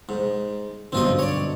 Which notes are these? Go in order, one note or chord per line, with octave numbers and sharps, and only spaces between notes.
G#2
B1 G2 D3 C4 F4 D#5
C#5 D5